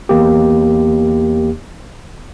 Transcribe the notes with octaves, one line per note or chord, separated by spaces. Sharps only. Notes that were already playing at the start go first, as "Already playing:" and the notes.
E2 A#3 G4